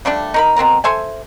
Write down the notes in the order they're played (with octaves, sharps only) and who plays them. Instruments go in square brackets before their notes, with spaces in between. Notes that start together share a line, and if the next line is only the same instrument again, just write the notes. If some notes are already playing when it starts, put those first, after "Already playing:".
[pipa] F3 G3 A3 D4
D#4 A#4 B5
B2 C4 A#4 A#5
A4 C5 E5 G#5